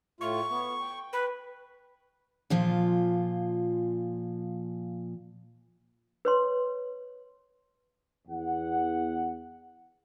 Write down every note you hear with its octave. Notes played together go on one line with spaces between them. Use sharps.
A2 A3 F4 C#6
B3
G5
B4
A#2 F3 F4
B4 C#5 C6
E2 F#5